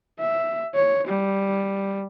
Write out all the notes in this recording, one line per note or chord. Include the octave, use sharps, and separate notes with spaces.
E5
C#5
G3